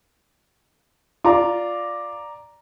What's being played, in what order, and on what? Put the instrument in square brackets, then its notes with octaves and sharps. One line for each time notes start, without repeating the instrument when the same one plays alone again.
[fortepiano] F4 [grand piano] D5 A#5 D6